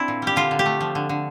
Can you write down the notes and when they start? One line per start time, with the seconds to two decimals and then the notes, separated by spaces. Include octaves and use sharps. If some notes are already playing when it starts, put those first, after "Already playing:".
Already playing: C4 D4 E4
0.08 A#2
0.22 G3 G4
0.36 D3 F4
0.51 D3
0.59 G4
0.66 A3
0.81 F3
0.95 D3
1.09 D3